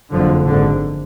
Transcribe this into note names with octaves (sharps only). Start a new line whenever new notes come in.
F#1 F2 D3 F3
G#1 G#2 D3